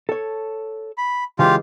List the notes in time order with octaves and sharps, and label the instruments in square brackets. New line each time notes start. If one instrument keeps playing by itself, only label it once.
[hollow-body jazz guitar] A4 C#5
[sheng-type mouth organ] B5
[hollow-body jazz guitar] C#3 E3 G#3 [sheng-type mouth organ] F4 G4 F5